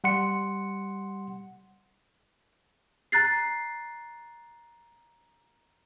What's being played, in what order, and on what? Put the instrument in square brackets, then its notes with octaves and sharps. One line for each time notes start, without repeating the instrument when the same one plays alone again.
[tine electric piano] G3 F#5 C6 C#7
[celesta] A#5 F#6 A6 C7